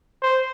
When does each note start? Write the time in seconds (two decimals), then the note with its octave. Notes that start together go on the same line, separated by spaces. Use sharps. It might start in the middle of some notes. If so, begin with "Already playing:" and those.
0.22 C5